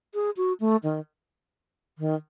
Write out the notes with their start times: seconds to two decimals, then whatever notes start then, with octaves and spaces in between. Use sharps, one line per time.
0.14 G#4
0.37 F#4
0.60 A3
0.83 D#3
1.99 D#3